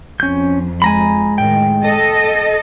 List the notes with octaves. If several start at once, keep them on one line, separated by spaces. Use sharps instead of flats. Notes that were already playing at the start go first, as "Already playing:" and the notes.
F2 C#4 G6
G#3 G#5 A#5 B5
A2 D#3 G5
A4 D#5